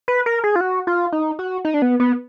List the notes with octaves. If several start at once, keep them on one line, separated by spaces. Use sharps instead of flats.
B4
A#4
G#4
F4
F#4
F4
D#4
F#4
D#4
D4
B3
B3